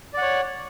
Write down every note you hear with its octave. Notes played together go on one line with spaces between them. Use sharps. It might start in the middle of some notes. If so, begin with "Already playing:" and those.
C#5 D5 F#5